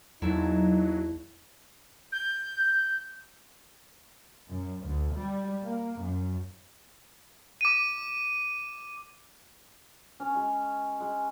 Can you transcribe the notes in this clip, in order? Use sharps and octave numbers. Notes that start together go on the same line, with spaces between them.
E2 F#3 A#3 D#4 E4 A5
G6
F#2
D2
G3
A#3
F#2
D6 D#7
C#4
G#3
G#3